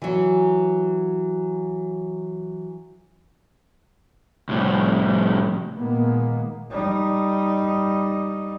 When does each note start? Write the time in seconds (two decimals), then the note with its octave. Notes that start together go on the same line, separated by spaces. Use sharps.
0.02 E3 F#3
4.49 C2 A2
5.77 A#2 D#3 G#3 A#3 B3
6.70 G3 D#4